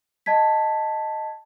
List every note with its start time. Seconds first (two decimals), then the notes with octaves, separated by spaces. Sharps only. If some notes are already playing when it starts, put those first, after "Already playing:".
0.26 D#5 A5 G#6 B6